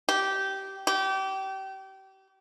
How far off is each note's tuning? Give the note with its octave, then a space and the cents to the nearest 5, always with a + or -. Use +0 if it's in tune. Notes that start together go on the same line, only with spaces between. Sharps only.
G4 -15
G4 -30